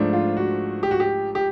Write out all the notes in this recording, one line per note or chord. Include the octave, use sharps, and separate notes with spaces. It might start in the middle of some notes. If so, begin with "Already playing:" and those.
Already playing: G#2 F3 A3 D4
F4
F#4
G4
F#4
G4
G4